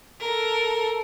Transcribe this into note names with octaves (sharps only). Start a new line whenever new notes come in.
A4 A#4